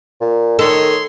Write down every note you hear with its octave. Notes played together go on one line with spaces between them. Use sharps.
A#2
D#3 A4 C#5 D#5 C6